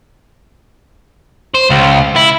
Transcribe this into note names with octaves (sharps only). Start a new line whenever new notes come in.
C5
C#2
E4